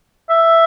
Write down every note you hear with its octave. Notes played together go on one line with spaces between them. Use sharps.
E5